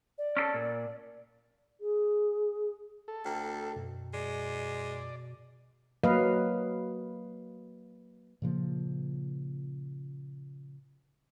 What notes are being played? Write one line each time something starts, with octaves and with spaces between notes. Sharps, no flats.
D5
C#4 D4 A4
A#2
G#4
A4
D2 G5 A#5
F#2 B2
G#3 D5
F#3 A#3 B4 D#5 F5
A#2 C#3 F3 A#3